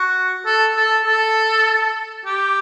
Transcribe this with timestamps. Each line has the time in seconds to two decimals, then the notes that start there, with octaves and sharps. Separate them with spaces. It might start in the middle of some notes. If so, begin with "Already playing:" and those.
Already playing: F#4
0.46 A4
0.76 A4
1.05 A4
2.26 G4